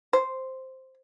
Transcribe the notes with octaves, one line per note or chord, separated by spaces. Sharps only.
C5